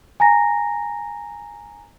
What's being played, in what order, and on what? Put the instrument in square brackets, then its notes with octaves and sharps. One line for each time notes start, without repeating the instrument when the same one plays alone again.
[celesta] G#5 A#5 A#6